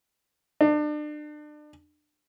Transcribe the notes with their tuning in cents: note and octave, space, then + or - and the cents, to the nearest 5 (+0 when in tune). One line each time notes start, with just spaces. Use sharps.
D4 +35